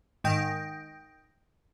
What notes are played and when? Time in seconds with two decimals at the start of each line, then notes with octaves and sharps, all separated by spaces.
0.24 G#2 D#3 D#5 G5